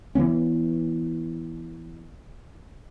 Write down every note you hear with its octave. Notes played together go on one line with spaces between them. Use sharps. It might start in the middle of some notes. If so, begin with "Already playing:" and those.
E3 F#3 B3 C#4